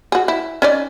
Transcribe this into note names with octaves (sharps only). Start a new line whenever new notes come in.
F#4 G#4
E4
C#4 D#4 D5